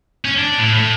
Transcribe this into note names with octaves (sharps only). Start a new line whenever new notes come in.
C#4
D4
A2
A2